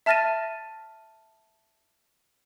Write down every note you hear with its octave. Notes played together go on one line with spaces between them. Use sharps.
E5 A5 F6 A6 A#6 D#7